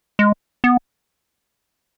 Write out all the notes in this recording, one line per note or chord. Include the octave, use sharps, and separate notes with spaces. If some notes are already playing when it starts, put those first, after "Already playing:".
G#3
B3